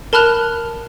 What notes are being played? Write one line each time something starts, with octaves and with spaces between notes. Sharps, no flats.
A#4 A5 B5 F6 F#6 F7